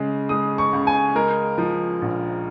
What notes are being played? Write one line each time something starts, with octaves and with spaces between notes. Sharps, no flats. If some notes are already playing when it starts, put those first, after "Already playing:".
Already playing: C#3 G#3
G#3 D#6
C#6
C#2
G#5
G#3 A#4
F3
A#1